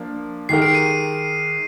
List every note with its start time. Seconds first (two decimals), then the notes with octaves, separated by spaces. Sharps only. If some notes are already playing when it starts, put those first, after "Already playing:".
Already playing: F3 A#3 D4
0.49 D#3 G#3 D#4 G4 A#4 C7
0.62 D7
0.75 D#7